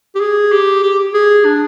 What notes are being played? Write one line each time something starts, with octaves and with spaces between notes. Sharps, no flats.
G4
G#4
G4
G4
G#4
D4